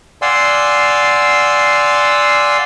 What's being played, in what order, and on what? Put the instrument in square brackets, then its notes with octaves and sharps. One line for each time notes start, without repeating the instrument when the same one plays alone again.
[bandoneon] D5 F5 F#5 G#5 C6 E6